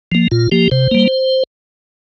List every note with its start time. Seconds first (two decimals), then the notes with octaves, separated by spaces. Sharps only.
0.12 F3 A#3
0.31 A#2 F4
0.52 F3 A#3 G4
0.71 C3 C5
0.91 G3 A#3